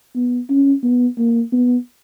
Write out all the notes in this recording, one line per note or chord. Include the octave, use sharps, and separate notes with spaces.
B3
C#4
B3
A#3
B3